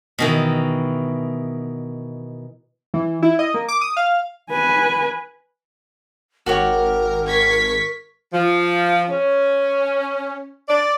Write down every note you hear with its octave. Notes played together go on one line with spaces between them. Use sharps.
B2 D#3 E3
E3
E4
D#5
A#3
D6
D#6
F5
B4 G#5
G#1 F#4 G4 A#4 C#5
C#6 G#6 B6
F3
C#4
D5